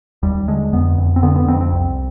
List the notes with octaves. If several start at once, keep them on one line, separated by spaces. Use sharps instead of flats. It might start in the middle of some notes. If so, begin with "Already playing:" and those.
D#2 G3
D3 G#3
F2 B3
F2
C4
D3 B3
B3
F2 C4
C4
C2